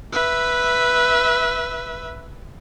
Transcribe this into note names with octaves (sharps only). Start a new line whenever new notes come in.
B4 E5